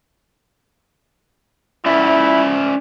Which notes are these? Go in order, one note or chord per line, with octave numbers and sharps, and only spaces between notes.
C#4 E4 D5 E5